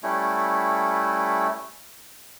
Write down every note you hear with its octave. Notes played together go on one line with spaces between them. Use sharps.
G3 A3 C#4 E4